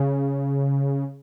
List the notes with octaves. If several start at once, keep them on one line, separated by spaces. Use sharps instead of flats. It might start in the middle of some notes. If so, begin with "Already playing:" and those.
Already playing: C#3